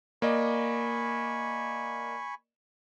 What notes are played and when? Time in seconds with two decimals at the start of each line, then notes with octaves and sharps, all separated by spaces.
0.22 A#3 D5 D#5 G#5 B5 C#6